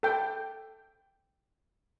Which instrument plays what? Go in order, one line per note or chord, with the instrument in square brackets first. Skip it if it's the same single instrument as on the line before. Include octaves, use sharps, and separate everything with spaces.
[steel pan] A4 G5